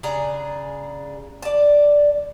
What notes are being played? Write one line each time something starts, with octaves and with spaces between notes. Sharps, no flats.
C#3 D4 G#4 A#5
D5 A5